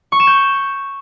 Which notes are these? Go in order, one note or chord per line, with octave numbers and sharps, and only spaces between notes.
C#6
E7
G6